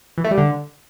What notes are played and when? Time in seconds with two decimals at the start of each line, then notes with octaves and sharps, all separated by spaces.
0.18 E3
0.24 A3
0.31 G3
0.38 D3